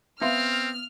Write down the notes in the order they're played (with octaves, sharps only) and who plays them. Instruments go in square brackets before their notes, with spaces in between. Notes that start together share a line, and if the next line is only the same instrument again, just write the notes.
[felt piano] B3 [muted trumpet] C4 [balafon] E5 F5 C6 [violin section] F6